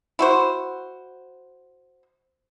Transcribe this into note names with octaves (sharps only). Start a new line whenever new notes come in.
E4 F#4 C5